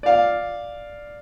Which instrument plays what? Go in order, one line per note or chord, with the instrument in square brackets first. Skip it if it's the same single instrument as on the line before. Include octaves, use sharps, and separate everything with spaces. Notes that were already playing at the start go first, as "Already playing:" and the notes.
[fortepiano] D5 F5